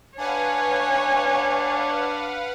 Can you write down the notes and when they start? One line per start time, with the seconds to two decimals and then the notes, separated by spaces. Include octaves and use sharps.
0.18 D4 B4 C#5 F5 F#5 G#5